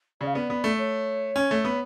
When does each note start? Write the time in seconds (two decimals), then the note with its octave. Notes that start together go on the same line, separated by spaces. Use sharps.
0.21 C#3 D5
0.27 F5
0.34 B3 D5
0.50 B3
0.64 A3
0.78 C#5
1.36 C#4
1.51 A3
1.65 B3